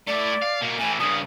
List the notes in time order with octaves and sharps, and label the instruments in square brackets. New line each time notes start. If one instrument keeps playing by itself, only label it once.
[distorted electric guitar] A3 E4 [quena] D5
[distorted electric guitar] F5
B2 A#3
[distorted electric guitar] A2 E3 [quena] G#5
[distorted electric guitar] G2 C#3 [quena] D#6